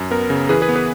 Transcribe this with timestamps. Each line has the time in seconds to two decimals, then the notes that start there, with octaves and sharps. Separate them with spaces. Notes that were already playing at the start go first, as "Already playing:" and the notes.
Already playing: F#2
0.11 B3 A#4
0.30 C#3
0.49 E3 G#4 B4
0.62 G#4 B4
0.69 B3
0.75 G#4 B4